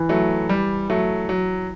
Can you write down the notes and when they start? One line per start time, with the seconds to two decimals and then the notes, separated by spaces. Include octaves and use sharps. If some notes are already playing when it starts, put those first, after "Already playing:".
Already playing: E3
0.09 F#3 A3
0.49 G3
0.90 F#3 A3
1.29 F#3